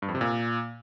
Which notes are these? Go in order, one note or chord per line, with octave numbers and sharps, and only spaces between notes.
G2
F2
C3
A#2